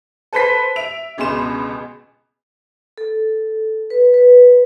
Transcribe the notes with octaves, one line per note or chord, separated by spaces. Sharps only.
A4 B4 C5 B5 B6
E5 D7 F7
G1 C#2 B2 G#4 C6 E7
A4
B4
B4